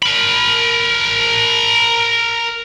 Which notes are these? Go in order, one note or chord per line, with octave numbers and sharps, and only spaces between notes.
A#4 B5